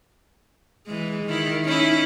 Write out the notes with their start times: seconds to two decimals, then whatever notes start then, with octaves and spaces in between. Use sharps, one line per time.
0.87 E3 G#3
1.25 D#3 E4
1.65 C#4 D#4 E4